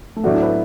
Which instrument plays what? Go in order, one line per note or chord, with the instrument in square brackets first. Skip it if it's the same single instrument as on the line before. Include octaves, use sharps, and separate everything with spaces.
[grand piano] A3
[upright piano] A2 F#3 D4 F#4 A4 [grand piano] B3
[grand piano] E4
B4